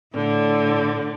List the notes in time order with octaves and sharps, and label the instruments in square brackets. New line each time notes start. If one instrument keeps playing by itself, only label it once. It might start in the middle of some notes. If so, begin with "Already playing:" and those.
[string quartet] A2 D3